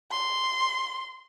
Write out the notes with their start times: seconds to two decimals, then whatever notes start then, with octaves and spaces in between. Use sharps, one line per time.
0.11 C6